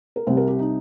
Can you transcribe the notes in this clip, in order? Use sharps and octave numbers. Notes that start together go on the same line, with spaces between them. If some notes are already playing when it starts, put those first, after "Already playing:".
A#4
C2 C3 G3 C5
A#4
G4
D#4